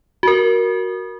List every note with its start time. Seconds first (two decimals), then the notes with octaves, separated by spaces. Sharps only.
0.23 F#4 A#4